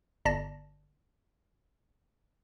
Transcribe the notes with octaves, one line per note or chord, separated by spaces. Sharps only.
G1 D5 A5 A#6